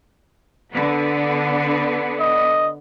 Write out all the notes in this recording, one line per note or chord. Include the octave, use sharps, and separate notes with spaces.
D3 B3
D#5